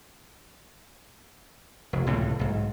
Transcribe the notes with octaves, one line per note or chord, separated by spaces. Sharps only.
F1
C#2 A2 C3 E3
B1 G#2